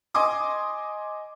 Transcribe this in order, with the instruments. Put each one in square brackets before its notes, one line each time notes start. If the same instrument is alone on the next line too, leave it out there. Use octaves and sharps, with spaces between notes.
[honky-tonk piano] D#5 G#5 C6 D6 D#6